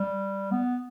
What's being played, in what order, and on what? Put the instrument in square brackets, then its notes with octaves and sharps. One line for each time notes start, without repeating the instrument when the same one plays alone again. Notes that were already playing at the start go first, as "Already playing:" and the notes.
Already playing: [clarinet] G3
B3